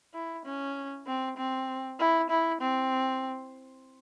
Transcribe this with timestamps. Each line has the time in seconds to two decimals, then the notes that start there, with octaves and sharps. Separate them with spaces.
0.14 E4
0.45 C#4
1.07 C4
1.37 C4
1.99 E4
2.30 E4
2.61 C4